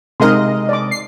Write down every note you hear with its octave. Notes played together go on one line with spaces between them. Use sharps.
C3 G#3 D#4 A#4 D#5 C6
D5 D6
C7